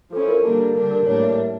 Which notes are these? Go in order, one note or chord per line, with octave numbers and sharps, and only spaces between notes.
F3 C#4 E4 A4
A#4
D3 G3 A#3 D4
D3 G3 D4 A#4
A#4
A2 G3 A#3 D4 C#5
E5
E5